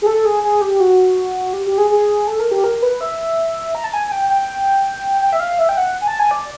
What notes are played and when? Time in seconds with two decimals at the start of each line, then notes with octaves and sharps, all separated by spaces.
0.02 G#4
0.06 A4
0.25 G#4
0.44 G#4
0.61 G4
0.80 F#4
1.53 G4
1.66 G4
1.78 G#4
1.90 G#4
2.27 A4
2.40 A#4
2.51 G4
2.64 A#4
2.82 B4
3.01 E5
3.75 A#5
3.84 A5
3.93 G#5
4.07 G#5
4.12 G5
4.29 G5
5.21 G5
5.33 E5
5.40 F5
5.59 E5
5.69 G5
5.77 F#5
6.01 G#5
6.08 A5
6.19 G#5
6.31 D5